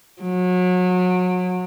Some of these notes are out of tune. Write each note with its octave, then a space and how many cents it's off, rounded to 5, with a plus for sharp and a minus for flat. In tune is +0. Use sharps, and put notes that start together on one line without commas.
F#3 -30